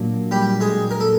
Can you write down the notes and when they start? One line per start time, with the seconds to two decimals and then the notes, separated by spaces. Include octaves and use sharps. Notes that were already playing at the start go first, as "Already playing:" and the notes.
Already playing: A#2 F#3 A#3 D4
0.31 G3 G4
0.60 G#3 G#4
0.91 A#4
1.00 A4